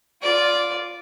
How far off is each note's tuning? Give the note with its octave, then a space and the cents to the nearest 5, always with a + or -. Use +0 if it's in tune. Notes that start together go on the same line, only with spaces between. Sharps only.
F4 +0 D5 -10